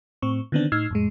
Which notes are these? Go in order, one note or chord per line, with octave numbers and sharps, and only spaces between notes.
A2 C4 C#6
D3 D#3 B3 C4 D4
A2 D#4 E6 F6 G#6 C7
F2 A2 G#3